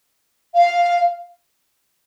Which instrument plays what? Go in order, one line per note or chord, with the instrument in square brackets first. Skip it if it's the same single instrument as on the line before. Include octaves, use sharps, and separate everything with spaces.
[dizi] F5